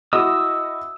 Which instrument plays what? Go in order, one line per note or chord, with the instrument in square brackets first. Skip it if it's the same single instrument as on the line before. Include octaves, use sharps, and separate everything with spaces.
[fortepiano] E4 F#4 D#5 [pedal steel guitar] D#6 E6